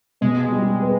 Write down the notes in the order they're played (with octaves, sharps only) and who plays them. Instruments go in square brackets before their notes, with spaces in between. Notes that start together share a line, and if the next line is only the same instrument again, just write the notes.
[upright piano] B2 [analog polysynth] G#3
[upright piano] G3
B3